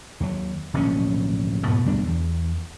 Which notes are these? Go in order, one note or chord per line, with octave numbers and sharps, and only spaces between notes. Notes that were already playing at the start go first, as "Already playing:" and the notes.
D#2 F#3
D1 A#1 B2 C#4
G#2 B2 B3
D2 B2 G3 D4
E2